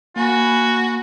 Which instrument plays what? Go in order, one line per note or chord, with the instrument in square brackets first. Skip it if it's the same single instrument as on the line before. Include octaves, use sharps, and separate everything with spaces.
[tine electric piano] A#3 [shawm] F#4 [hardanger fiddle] G#5 B5